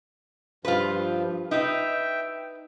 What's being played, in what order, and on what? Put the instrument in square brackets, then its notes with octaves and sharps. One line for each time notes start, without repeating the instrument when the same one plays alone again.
[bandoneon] G2 F3 [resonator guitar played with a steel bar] F4 B4
[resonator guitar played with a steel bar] D#4 B4 [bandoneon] E5 G5